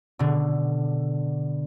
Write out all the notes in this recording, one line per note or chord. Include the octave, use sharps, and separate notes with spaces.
B2 D3